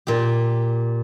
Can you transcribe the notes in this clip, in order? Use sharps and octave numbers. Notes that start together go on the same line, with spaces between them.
A#2 G4